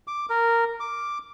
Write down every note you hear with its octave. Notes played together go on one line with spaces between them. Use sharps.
D6
A#4
D6